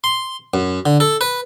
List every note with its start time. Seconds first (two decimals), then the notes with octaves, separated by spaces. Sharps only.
0.04 C6
0.54 F#2
0.86 D3
1.00 A4
1.21 B4